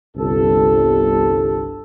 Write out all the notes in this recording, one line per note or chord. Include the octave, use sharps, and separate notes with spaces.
G1 C2 A4